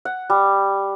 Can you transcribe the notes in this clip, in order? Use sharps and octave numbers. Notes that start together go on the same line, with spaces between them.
F#5
G3